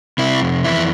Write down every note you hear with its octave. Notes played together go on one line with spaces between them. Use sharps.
C3 E4
F2
E3 E4